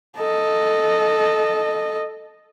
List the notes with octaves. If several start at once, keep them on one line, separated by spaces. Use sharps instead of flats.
A4 D#5